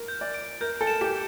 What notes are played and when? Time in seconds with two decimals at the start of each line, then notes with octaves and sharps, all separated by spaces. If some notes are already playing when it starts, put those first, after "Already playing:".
Already playing: A#4
0.08 G6
0.21 D5
0.34 D7
0.61 A#4 G6
0.81 A4
0.87 E7
1.01 G4